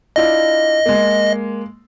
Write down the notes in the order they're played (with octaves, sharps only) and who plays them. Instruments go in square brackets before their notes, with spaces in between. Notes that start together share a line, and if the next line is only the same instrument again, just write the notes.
[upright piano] D4 E4 F4 [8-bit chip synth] D#5
[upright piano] G#3 A#3